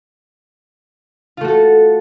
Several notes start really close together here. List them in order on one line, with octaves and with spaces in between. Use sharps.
F4 A3 F#4 A4